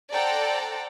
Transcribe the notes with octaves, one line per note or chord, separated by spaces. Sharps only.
A4 C5 D5 F#5 G5 A#5